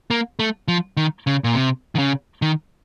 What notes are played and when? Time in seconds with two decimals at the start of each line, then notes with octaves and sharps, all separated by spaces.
0.11 A#3
0.39 A3
0.68 F3
0.97 D#3
1.27 C#3
1.44 A#2
1.55 C3
1.95 D#3
1.99 C#3
2.42 D#3